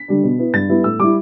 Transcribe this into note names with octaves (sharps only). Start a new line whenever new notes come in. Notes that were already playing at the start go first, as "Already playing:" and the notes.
Already playing: B6
D3 G3 D4
B2
B3 E4
G2 A6
G3 B3 E4
A2 E6
G3 E4 D6